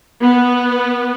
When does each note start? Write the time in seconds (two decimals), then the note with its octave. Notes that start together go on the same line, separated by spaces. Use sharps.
0.23 B3